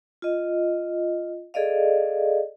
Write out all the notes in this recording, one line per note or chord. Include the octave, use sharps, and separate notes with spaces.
F4 D#5
G#4 A4 D5 D#5 F5